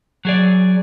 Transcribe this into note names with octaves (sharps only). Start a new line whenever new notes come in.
F#3 G#4 D5